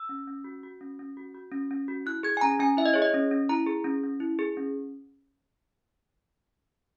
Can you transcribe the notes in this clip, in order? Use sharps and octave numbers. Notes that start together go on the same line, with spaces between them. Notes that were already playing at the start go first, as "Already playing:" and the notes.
Already playing: E6
C#4
C#4
F#4
F#4
C#4
C#4
F#4
F#4
C#4
C#4
F#4
E4 F#6
G#4 G#6
G#5
C#4 A#5
C#4 G#5
E4 E5
D#5
G#4 C#5
D#5
C#4
C#4
E4 A#5
G#4
C#4
C#4
E4
G#4
C#4